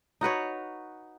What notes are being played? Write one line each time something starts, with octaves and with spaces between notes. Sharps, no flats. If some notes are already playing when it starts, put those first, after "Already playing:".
D#4 F#4 B4 C#5